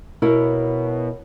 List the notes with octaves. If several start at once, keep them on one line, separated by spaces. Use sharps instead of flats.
B2 E4 A#4 C#5